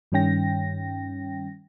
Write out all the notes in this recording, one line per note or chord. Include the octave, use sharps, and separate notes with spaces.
G2 D#3 G3 C#4 G5 A#6